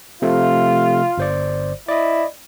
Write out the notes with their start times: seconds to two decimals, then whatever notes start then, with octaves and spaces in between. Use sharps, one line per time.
0.22 C3 F3 A3 F4
1.18 G1 C5 D5
1.88 E4 D5 D#5